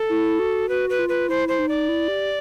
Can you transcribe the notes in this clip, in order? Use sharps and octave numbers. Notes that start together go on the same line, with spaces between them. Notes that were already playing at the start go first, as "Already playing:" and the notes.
Already playing: A4
E4
F#4
F#4 B4
B4
F4
B4
E4 C5
C5
D#4
D5
E4
G4